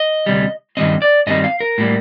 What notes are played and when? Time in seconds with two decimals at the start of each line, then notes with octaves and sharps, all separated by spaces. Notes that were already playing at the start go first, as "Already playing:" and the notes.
Already playing: D#5
0.26 D2 C3 G3
0.77 G2 D#3 G3 C4 D#5
1.02 D5
1.27 G2 D#3 G3 C4 D#5
1.44 F5
1.60 A#4
1.78 A2 G3 A#3